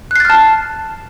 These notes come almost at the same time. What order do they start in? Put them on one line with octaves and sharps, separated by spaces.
F#6 C7 A6 F6 A5